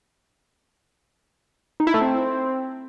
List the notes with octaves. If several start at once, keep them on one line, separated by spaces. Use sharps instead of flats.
D#4
E4
A3
C4